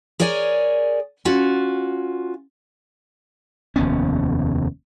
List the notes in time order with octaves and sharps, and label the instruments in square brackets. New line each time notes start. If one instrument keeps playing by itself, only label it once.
[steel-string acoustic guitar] G#4 A#4 C#5 D5 G#5
C#4 F4 F#4
[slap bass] F1 D#2 B3 C#4